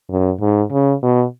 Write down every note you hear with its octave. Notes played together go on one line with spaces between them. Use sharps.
F#2
G#2
C#3
B2